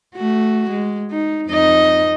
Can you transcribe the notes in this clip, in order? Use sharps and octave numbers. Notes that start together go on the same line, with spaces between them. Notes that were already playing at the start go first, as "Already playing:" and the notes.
A3 F#4
G#3
D#4
F2 D#4 D#5